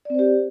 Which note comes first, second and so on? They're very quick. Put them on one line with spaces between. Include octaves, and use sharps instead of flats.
D5 C4 C5 G4